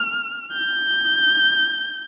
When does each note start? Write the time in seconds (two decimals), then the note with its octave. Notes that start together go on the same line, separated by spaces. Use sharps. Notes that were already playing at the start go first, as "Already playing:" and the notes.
Already playing: F6
0.53 G6